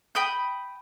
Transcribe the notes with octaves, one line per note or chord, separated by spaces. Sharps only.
G5 B5 D#6 G6